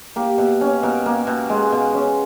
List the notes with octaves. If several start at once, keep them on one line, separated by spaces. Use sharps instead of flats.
A#3 G4
B2
C#4
B2 A#4
A#3
B2
G#3
B2
C#4